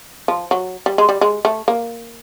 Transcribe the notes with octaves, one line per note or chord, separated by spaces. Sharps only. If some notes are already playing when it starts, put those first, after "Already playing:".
F3
F#3
G3
G#3
G3
G#3
A3
A#3